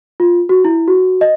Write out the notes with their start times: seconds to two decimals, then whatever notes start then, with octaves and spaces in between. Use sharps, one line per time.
0.20 F4
0.49 F#4
0.65 E4
0.88 F#4
1.21 D#5